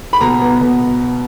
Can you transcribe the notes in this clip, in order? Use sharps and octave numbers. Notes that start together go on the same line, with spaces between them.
B5
B2 A#5
B3
B2